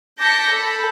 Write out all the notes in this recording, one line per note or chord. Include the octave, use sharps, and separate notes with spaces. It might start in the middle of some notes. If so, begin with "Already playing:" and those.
A5 D6 G6 A#6 B6 C#7
A4 B5